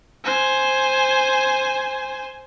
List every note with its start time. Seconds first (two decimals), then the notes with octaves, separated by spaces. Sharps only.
0.25 C5 G#5